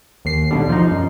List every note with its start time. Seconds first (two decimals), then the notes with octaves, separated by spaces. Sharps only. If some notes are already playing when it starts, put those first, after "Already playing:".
0.25 D#2 C7
0.51 B1 G#2 B2 D3 G3
0.69 F3 D#4
0.91 F#2